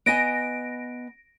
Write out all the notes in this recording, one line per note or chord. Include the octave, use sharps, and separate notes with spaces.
B3 D#5 G#5 A#6 D7